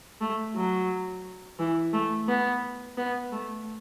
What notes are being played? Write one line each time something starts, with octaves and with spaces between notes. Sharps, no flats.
A3
F#3
E3
A3
B3
B3
A3